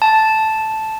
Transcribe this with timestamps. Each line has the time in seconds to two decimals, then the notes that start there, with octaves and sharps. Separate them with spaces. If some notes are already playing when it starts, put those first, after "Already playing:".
0.02 A5